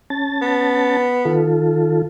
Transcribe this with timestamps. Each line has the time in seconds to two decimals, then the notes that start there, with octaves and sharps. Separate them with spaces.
0.10 C#4 A5 A6
0.42 B3
1.25 D#3 F4 A4